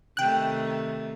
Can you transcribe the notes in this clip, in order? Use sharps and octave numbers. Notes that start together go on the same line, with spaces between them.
C3 D#3 A3 G5 F#6